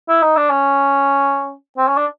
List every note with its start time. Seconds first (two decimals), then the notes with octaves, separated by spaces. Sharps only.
0.09 E4
0.23 D#4
0.37 D4
0.50 C#4
1.77 C4
1.88 C#4
1.97 D4